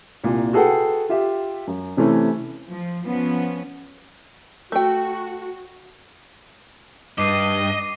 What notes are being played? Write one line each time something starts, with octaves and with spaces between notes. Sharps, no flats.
C2 A#2
F#4 G#4 A4 B4 F#5 G5
F4 G4 E5
F#2
C3 E3 A3 C#4 E4
F3
F3 B3 C#4
A3 F#4 G5
G2 D#5 D6 C7 D#7